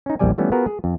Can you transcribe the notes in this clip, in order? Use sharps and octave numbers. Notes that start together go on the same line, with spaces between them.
C#4 D#4
A#1 E2 G3 D5 G#5
E3 F3 G3 A3 B3 C#4
B3 F4 F#4 G#4 A#4 B4
G#4
F2